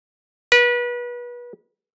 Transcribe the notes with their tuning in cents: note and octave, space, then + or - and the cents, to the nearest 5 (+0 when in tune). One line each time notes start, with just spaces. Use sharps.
B4 -30